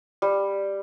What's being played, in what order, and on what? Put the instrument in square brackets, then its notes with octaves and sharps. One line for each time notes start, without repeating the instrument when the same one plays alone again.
[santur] G3